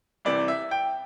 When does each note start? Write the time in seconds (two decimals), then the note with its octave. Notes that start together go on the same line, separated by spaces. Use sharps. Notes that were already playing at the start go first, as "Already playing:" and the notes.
0.25 C2 C3 E3 D5
0.48 E5
0.71 G5